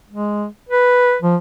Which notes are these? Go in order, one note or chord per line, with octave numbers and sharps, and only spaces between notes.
G#3
B4
F3